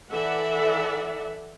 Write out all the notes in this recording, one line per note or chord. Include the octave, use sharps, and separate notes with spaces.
E3 A4 D5 E5 F#5